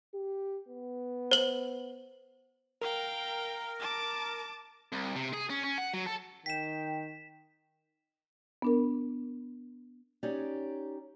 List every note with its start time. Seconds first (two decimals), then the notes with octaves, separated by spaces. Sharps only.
0.14 G4
0.69 B3
1.31 C5 F#7
2.81 A#4 F5 G5
3.79 A5 D6
4.93 C2
5.16 C3
5.33 G#4
5.50 C#4
5.64 C#4
5.78 F#5
5.94 F#3
6.06 A4
6.46 D#3 G5 B6 E7
8.62 B3 D4 A#4
10.23 C#4 D#4 G4 C#5 D5